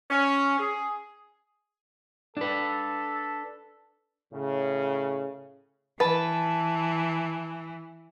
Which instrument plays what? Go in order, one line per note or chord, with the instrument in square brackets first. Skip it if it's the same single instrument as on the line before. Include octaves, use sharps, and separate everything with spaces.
[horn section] C#4
G#4
[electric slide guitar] D4 B4 [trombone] A4
[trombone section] A2 C#3
[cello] E3 [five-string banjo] B4 [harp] A5